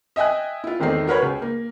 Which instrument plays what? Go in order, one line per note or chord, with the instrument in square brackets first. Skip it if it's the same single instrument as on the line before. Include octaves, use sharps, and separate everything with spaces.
[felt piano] D#5 E5 G5 G#5 F#6
E4 F4
G#1 E2 D#3 A3 C4 C7
F#4 A#4 B4 C#5
C#2
A#3